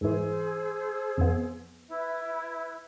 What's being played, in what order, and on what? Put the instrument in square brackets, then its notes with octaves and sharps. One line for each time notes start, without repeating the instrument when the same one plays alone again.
[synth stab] G#2 E3 [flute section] G#4 C5 E6
[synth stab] F2 B3
[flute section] E4 B4 E5